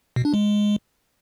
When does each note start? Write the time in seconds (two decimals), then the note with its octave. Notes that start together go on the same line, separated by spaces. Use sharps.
0.16 B2
0.25 D4
0.34 G#3